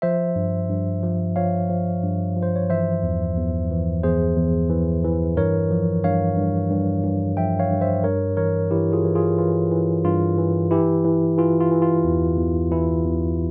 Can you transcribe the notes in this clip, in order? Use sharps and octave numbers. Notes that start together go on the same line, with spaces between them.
F3 C5 E5
G2
G2
F3
F3 C#5 F5
F3
G2
F3
C5
C#5
E3 C5 E5
E2
E2
E3
E2 G#4 C5
E2
E3
E3
G2 A#4 C#5
F3
G2 C#5 F5
G2
G2
G2
F3 E5 G5
C#5 F5
G2
C5 E5
G2 A#4 C#5
E3 A#4 C#5
E3 E4 G4
F4 G#4
E3
F4 G#4
E3 F4
E3
G2 F4
E3
E3 E4 G4
E3
E3 F4
F4
E3
F4
E2
E2
E3 E4
E2